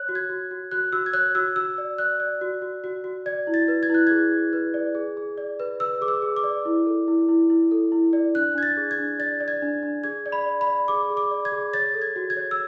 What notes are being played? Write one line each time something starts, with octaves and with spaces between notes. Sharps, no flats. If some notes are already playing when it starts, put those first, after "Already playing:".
Already playing: C#5 F#6
F#4
G#6
F#4
F#4
F#4 F#6
F#4 E6
G#6
C#5 F#6
F#4 E6
F#4 E6
D5
D5 F#6
D5
F#4
F#4
F#4
F#4
D5 G#6
E4
A6
B4
G#6
E4 F#6
G#4 G#6
G#4
B4
D5
G#4
G#4
D5
B4
B4 E6
G#4 D6
E6
G#4
D6
D5
E4
A4
E4
E4
E4
A4
E4
D5
D4 F#6
D4 G#6
A6
G#4
G#6
D4
D5 A6
D5
G#6
D4
D4
G#4 G#6
D5
B5
D5
B5
D5
G#4 D6
G#4
D6
D5
G#6
G#4
C#5 A6
A4
G#6
F#4
G#6
C#5
E6